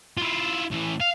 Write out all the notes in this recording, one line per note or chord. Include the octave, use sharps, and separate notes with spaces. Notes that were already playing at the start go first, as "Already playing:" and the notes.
E4 F4
A2 E3
F5